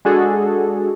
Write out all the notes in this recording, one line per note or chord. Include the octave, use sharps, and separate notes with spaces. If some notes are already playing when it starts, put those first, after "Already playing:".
G#3 D4 F#4 G#4 A4